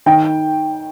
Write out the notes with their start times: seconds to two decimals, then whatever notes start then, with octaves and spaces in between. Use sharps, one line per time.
0.06 D#3 G5